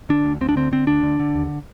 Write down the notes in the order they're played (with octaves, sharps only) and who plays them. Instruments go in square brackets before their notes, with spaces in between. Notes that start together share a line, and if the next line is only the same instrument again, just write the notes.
[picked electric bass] D3 D4
D2
D2 C4
D4
D3 C4
D3 C4
D2 D4
D3
D3
D#2